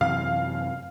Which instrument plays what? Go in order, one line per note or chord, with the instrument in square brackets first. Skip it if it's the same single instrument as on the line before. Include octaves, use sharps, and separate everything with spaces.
[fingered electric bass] F#2 C3 E3 [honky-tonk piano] F5